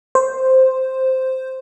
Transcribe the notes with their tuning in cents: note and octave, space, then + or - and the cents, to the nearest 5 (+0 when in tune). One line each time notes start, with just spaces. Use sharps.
C5 +0